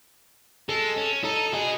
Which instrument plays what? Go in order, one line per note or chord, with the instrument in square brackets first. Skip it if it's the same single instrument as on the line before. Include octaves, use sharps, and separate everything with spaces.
[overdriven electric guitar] G#3 [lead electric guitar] A4
[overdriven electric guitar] C#4
[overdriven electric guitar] D#4 [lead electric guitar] A4
[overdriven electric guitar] F#4 D#5 [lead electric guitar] G#4